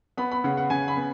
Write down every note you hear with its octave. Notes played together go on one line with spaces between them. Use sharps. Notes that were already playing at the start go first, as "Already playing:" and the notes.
B3 B5
B5
C#3 F#5
F#5
C#3 G#5
B5
B3